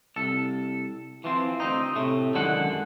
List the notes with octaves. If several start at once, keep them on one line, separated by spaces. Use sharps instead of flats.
C2 A4
E3 F3 C4
D2 C4 D#4
A2 C3 A3
F#2 D3 D#3 G#3 A4 F#5